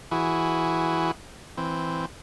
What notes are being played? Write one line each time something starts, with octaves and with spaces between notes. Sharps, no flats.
E3 E4 F#4 G#4
E3 C4